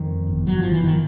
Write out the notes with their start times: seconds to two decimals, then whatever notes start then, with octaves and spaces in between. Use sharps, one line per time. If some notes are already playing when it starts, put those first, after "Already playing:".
Already playing: F2 D#3
0.27 G1
0.47 F#3
0.59 G1 F3
0.72 E3
0.84 D#3